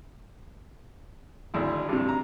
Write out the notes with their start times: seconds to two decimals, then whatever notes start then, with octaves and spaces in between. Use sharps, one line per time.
1.54 G#1 D2 E4
1.89 G2 C3
2.08 A#5